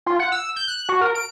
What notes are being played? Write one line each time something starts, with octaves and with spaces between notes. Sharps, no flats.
F4
F#5
E6
G6
F#6
F#4
A#4
D7